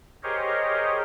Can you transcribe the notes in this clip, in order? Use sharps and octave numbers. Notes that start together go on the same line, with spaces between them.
G4 G#4 A#4 C5 C#5 D#5